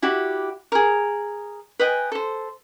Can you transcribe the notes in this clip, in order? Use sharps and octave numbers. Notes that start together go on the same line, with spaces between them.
E4 F#4 G4 D5
G#4 A#4
B4 D#5 G5 G#5
A4 C5